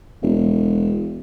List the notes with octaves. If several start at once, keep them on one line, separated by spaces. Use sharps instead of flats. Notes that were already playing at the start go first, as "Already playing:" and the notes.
E1